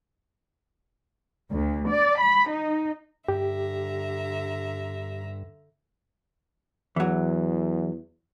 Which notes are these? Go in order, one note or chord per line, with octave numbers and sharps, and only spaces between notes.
D2
D5
B5
D#4
G2 D3 G4 E5 A#5
E2 E3 F#3